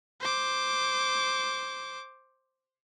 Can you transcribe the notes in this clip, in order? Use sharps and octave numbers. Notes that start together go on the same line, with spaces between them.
C5 D6